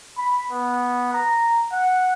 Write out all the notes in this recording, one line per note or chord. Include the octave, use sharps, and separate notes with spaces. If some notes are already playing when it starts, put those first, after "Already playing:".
B5
B3
A#5
F#5